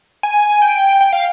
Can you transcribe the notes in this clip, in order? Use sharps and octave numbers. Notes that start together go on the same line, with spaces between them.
G#5
G5
G5
F5